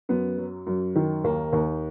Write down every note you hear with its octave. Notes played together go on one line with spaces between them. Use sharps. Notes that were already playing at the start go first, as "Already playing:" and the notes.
F#2 B3
F#3
F#2
D#3
D#2 A#3
D#2